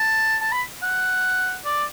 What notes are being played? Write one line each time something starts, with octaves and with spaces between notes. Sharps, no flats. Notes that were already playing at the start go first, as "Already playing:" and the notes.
Already playing: A5
A5
B5
F#5
D5